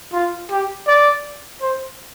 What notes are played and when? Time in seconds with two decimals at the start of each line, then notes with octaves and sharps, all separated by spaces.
0.13 F4
0.51 G4
0.87 D5
1.62 C5